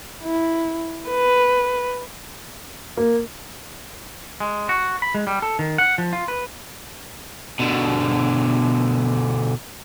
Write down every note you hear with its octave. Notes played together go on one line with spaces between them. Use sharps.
E4
B4
A#3
G#3
F#4
B5
G#3
G3
A4
D#3
F#5
F3
F4
B4
B2 D3